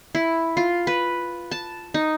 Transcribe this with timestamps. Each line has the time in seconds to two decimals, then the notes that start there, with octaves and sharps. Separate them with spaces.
0.15 E4
0.57 F4
0.87 B4
1.51 A5
1.94 D#4